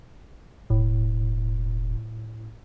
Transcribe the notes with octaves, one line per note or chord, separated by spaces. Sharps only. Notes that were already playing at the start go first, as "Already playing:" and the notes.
E1 A2